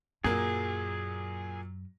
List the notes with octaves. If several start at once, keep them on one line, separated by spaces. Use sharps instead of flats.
F#2 A#2 F#3 A#3 G#4